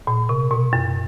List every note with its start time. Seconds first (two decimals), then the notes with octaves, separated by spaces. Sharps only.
0.07 A#2
0.29 C3
0.51 B2
0.73 F#2